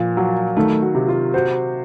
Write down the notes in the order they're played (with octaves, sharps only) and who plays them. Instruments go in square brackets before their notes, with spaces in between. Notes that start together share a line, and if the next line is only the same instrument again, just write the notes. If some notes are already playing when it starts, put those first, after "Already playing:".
Already playing: [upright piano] A#2 [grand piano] F3
[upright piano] F#3
[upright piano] D#3 [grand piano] A3
[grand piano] F#4
[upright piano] C3
[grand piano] F4
[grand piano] F#4 [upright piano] C5